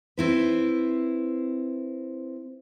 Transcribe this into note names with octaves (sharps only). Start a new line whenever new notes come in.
C4 E4 B4